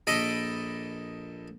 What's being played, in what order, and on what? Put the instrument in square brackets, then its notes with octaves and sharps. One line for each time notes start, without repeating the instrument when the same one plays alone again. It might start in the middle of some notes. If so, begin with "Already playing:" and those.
[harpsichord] A#1 A4 D#5 B5 D6